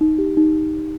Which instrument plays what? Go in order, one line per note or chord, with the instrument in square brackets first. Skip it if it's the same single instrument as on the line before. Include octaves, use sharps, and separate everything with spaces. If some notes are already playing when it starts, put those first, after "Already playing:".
[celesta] D#4
G4
D#4